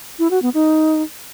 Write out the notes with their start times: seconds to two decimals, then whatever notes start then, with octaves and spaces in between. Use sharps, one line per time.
0.19 E4
0.31 F#4
0.42 B3
0.54 D#4